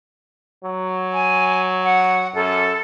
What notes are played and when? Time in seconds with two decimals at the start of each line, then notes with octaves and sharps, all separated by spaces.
0.64 F#3
1.13 G#5
1.84 F#5
2.35 F#2 A4